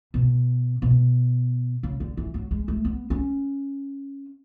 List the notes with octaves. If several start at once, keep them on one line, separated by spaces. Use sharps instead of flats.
B2
B2
C#3
D3
E3
F#3
G#3
A3
B3
C#4